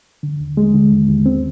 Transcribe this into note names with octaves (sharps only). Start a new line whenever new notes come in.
D3
D#2
G#3
D3
D#2
D#2
C4